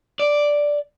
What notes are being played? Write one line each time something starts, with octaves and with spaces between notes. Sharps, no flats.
D5